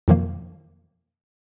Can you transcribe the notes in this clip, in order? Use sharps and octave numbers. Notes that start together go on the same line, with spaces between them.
F2 B2 D#3 F3 F#3 A#3